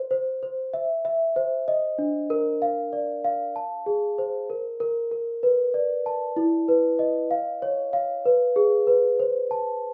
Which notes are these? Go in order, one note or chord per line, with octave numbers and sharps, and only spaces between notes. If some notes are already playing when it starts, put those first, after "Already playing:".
Already playing: C5
C5
C5
E5
E5
C5
D#5
D4
A#4
F5
D5
F5
A5
G#4
C5
A#4
A#4
A#4
B4
D5
A5
E4
B4
D#5
F5
C#5
F5
B4
G#4
B4
C5
A5